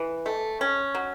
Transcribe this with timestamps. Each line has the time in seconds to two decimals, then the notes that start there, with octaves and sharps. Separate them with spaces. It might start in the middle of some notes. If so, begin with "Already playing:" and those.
Already playing: E3
0.26 A3
0.61 C#4
0.95 F#3